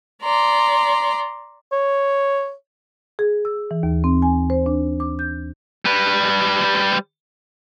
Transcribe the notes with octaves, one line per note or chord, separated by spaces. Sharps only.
D5 A#5 C6
C#5
G#4
E6
E3
D#2
C4
G#5
C5
D4
D6
G6
G3 B4